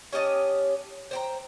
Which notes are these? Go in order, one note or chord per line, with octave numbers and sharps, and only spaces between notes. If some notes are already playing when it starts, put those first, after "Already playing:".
C#4 G4 D#5 A5
C5 G5 A#5